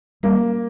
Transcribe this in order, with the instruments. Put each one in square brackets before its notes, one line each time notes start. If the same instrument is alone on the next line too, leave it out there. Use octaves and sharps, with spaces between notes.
[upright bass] G3 [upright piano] A#3